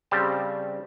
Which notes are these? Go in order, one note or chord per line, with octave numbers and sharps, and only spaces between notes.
C#3 G3 C4 G4 C5 A5